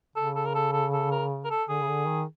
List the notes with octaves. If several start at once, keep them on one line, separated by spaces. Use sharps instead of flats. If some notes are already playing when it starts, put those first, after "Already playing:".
C#3 A4
A4
A#4
A4
A4
A4
A#4
A#4
A4
D3 G#4
C#3
D3
D#3